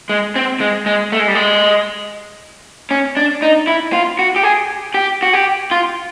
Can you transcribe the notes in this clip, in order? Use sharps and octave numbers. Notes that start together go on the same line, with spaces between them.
G#3
C4
G#3
G#3
A3
G#3
G3
G#3
C#4
D4
D#4
E4
F4
F#4
G4
G#4
G4
F#4
G4
F4